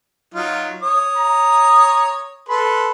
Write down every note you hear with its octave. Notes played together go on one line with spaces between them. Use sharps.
F#3 D#4 F4
C#5 D#6
A#5
A4 B4 B5 C6